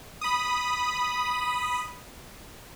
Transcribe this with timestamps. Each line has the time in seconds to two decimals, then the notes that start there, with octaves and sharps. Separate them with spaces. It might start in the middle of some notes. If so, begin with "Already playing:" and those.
0.21 B5 D#6